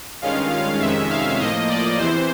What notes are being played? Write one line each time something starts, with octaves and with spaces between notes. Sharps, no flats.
G2 D#3 G#3 C#4 F4 F5
F5
F2 C3 D#3 G#3 C#4 E5
F5
A2 F3 A#3 D#5
D5
E2 C3 E3 C5